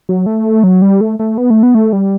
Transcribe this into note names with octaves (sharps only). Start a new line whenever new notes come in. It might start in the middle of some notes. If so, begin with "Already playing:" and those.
F#3
A3
F#3
G3
A3
A3
B3
A3
B3
A3
G3